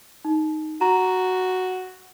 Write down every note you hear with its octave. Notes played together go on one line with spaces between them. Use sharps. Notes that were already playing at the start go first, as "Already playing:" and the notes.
D#4
F#4 A#5